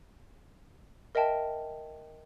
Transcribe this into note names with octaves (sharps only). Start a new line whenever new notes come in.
A#4 D#5 E5 G5 A5